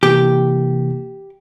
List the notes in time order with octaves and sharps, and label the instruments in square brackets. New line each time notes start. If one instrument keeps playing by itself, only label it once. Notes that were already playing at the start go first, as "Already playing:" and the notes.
[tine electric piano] C3 E3 A#3 [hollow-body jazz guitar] G4